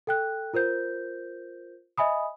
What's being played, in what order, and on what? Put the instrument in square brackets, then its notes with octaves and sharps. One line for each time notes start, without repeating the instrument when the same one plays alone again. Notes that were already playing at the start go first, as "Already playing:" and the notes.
[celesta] A4 G5 F#6
F4 A#4 C5 G6
D#5 E5 G#5 B5 D#6